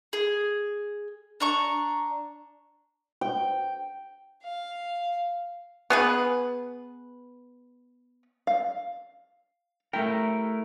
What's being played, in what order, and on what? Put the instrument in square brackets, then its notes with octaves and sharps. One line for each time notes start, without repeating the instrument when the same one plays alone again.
[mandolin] G#4
D4 A#5 C#6
[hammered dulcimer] G5
[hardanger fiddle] F5
[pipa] B3 G#4 B4
[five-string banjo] F5
[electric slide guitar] A3 E4 A#4 [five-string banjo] G4